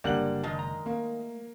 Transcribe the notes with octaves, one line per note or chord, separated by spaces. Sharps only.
F#1 D3 G3 A#3 D4 F#5 F#7
D#3 G#3 F4 A5
A#5
A3 A#3